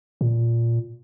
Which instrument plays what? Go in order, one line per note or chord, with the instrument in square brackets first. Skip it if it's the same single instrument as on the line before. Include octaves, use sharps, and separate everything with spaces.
[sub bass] A#2